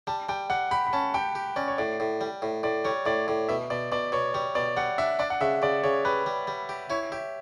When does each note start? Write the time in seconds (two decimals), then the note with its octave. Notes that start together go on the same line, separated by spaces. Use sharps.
0.07 G3 A5
0.29 G3 G5
0.50 G3 F#5
0.71 G4 B5
0.87 B5
0.93 C#4 A5
1.14 G4 G5
1.35 G4
1.56 C#4 D5
1.68 C#5
1.78 A2 D5
2.00 A2
2.21 G3
2.42 A2
2.63 A2 D5
2.85 G3 C#5
3.06 A2 D5
3.27 A2 D5
3.49 B2 E5
3.70 B2 D5
3.92 B2 D5
4.12 B2 C#5
4.34 G3 C#5
4.55 B2 D5
4.77 G3 F#5
4.98 D4 E5
5.19 D4 D5
5.30 F#5
5.41 C#3 E5
5.62 C#3 D5
5.83 C#3 C#5
6.05 G3 B4
6.26 G3
6.47 G3
6.69 G4
6.90 E4 C#5
7.12 G4 E5